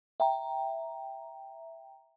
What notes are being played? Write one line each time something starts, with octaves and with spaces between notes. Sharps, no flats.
E5 G5 A#5